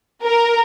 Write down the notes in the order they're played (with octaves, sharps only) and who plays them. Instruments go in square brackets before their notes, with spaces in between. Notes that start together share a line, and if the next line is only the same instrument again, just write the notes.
[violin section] A#4